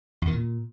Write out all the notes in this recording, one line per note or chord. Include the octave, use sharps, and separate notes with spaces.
E2
D#3
A#2